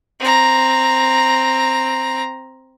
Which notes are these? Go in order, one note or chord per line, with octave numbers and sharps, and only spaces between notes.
C4 A#5